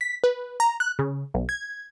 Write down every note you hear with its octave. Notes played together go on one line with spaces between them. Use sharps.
B6
B4
A#5
F#6
C#3
B1
G#6